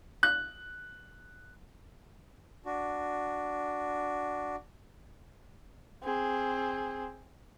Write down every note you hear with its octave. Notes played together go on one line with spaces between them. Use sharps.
F#6
D4 F#4
C4 G#4